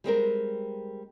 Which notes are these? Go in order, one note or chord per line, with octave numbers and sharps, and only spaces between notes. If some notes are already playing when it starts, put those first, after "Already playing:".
G3 G#3 C4 A#4